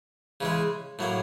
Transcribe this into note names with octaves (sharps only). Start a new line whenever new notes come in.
C#3 E3 G#3
A2 F#3 A#3